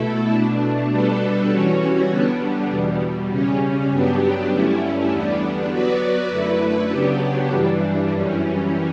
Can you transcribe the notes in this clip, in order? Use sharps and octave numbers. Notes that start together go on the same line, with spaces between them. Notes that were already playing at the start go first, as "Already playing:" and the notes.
Already playing: B2 A3 E4 A4
B2 A3 D4
B2 G3 B3 D4 A4
E3 G3 C#4 F#4 C#5
D3 G3 B3 D4
E2 B2 G3
C#3 G3 C#4
G2 F#3 B3 D4 G4
G2 D3 A3 C#4 E4
E2 D3 G3 B3 D4
F#3 B3 F#4 B4 D5
F#2 D3 A3 E4 B4
C#3 F#3 B3 D4 G4
G2 E3 G3 D4
F#2 E3 G3 C#4